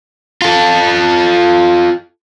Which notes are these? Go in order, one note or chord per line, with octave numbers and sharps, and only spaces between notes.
F4 A4